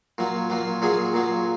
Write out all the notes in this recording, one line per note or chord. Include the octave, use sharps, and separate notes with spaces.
A#2 F#3
A#2 F#3
A#2 F#3 G#4
A#2 F#3